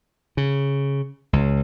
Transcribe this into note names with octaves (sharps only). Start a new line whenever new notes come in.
C#3
C#2